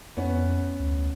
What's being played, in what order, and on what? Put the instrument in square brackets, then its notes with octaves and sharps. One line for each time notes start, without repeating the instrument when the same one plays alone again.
[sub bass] F2 [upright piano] B3 C#4
[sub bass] D2